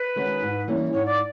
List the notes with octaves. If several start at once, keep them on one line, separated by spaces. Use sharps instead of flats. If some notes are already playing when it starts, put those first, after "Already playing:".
Already playing: B4
D#3 G#3 C#4 F#4
G#2
E3 G3 A#3 C#4
G#2 C#5
D5